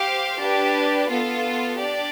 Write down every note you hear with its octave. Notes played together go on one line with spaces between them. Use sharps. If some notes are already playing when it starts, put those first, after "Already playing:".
Already playing: G4 C5 F5
D4 G4 B4
B3 F4 A4
D4 G4 D5